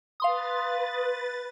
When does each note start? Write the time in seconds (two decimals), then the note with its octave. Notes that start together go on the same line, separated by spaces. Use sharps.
0.20 B4 F5 C6 D#6 A6